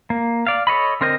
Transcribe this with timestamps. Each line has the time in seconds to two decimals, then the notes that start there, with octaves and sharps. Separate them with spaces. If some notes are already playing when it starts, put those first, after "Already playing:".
0.10 A#3
0.47 D5 F5
0.67 A4 C#5 D#5 B5
1.01 D3 C4 A#4 C5 D#5